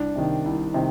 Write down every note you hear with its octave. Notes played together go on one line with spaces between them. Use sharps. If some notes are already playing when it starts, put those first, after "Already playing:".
Already playing: C2 D4
C3 D#3
C2
C3 D#3